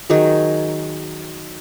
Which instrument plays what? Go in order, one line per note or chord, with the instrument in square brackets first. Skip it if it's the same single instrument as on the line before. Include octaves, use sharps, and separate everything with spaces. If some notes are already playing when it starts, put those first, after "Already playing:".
[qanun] D#3 F#3 G#4